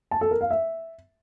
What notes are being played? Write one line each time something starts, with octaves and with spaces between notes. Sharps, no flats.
A5
A4
A#4
F5
E5